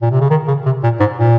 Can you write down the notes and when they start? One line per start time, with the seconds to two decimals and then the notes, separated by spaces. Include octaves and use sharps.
0.02 A#2
0.11 C3
0.21 C#3
0.30 D#3
0.48 C#3
0.66 C3
0.83 A#2
1.00 G#2
1.18 A#2